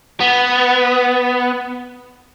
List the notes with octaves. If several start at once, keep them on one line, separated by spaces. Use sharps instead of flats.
B3